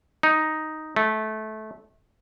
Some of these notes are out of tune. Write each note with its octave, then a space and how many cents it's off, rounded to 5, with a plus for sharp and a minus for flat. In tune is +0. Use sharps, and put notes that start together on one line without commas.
D#4 +0
A3 -20